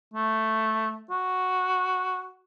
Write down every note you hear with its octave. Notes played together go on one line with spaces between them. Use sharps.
A3
F#4